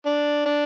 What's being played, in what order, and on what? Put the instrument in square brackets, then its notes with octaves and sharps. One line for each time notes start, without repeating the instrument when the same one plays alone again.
[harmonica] D4
D4